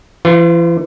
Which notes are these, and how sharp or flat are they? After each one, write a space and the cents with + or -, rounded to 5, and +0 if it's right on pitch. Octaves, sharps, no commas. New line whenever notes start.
E3 +40 F4 +0